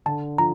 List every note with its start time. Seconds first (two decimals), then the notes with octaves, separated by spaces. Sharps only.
0.06 D3 A5
0.38 F3 A#5